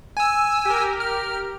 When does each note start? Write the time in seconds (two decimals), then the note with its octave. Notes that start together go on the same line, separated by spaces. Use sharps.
0.17 G#5 E6
0.65 G4 A#4
1.00 F6